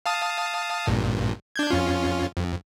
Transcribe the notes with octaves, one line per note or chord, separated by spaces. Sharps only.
F5 A5 D#6
A1 G2 A#2
D4 G6 G#6
F2 C#4 F4
F2